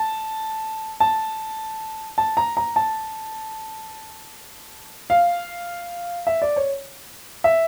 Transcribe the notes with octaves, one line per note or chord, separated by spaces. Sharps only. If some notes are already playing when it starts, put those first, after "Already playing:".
Already playing: A5
A5
A5
A#5
A#5
A5
F5
E5
D5
C#5
E5